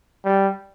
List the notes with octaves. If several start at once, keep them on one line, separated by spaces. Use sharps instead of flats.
G3